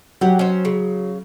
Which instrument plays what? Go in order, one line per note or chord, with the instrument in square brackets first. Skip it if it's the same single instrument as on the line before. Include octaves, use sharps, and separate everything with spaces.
[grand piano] F#3 [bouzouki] G4 F#5
[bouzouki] C#4 C5
C#3